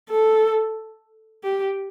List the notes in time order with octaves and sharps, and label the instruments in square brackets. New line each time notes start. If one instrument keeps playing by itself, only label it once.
[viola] A4
G4